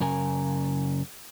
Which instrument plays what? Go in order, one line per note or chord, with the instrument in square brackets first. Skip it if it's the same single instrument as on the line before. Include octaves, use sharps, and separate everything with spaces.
[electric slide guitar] F#2 C#3 A#4 G#5